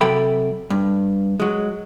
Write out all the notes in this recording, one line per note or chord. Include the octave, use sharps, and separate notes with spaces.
C3 F#3 A4 G5 B5
G2
F#3 G#3